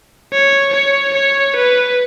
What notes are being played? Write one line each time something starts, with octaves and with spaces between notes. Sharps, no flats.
C#5
C#5
C#5
B4